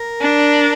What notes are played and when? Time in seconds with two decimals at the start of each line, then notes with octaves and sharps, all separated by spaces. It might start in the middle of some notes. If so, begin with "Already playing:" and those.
Already playing: A#4
0.21 D4